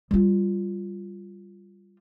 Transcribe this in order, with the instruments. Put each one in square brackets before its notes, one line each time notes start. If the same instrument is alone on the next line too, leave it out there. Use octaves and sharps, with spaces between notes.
[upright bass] G3 F4